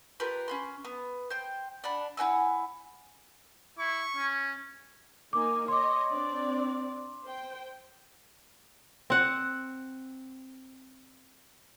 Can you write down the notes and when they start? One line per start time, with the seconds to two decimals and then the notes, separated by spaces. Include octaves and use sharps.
0.20 F4 G4 A#4 B4
0.48 C#4 B5 C6
0.85 B3
1.30 C5 G5
1.84 D4 F#5 B5
2.17 E4 F#5 G#5 E6
3.79 E4 C#6
4.17 C#4
5.33 A#3 D#4 G#5 D6
5.68 C#5 D#5 C6 D6
6.10 C4 D4 D5
7.24 C5 G5
9.10 C4 F#5